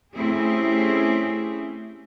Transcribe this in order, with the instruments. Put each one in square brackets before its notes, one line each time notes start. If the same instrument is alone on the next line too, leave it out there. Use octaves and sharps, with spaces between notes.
[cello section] A3 C4 C#4 E4 G4 G#4